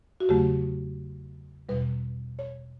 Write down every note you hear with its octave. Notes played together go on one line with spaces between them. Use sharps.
F#4
E2 C#3 F#3 A3 G4
E2 B2 G3 B4
C#5